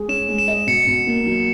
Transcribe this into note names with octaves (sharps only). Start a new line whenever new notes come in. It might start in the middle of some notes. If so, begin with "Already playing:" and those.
Already playing: G#3 G#4
C#4 E7
G#3
E7
D#5
B2 C#7
B2
A#3
F#3